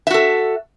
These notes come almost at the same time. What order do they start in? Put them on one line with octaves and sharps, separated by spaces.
E5 F#4 A4